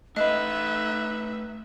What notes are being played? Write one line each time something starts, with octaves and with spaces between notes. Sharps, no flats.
A3 D#4 B4 D#5 E5 F#6